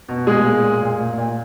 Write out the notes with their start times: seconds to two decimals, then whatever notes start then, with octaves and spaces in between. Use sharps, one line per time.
0.09 B2
0.26 A#2 G#3 G#4
0.45 A#2
0.63 A#2
0.82 A#2
1.00 A#2
1.18 A#2